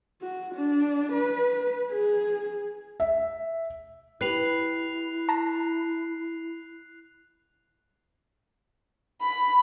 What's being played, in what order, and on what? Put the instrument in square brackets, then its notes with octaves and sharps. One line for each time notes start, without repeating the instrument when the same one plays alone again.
[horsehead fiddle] F#4
D4
B4
G#4
[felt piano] E5
[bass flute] E4 [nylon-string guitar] G4 B4 [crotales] F#6 C7 F7
[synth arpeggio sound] A5 A#5
[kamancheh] B5